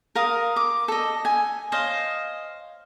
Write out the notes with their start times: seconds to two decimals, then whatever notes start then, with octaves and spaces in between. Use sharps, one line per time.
0.15 A#4 F5 D#6
0.56 D6
0.88 A4 D#5
1.25 G#5
1.72 C5 C#5 D#5 F5